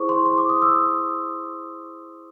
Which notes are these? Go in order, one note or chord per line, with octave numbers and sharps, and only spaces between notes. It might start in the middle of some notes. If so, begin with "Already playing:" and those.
Already playing: E4 G#4 C5 C#6 D6
C6
C6
D6
D#6
E6